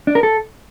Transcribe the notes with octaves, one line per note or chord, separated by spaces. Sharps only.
D4
A#4
A4